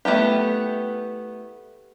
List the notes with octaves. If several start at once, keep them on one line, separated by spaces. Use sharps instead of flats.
A3 B3 E4 G4